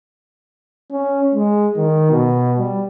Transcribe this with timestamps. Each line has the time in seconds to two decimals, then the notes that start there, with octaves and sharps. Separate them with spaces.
0.91 C#4
1.35 G#3
1.76 D#3
2.11 B2
2.59 G3